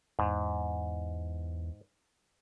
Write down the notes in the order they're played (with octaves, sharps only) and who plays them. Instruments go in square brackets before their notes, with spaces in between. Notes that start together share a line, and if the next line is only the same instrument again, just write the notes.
[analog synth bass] E2 [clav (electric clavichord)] G#2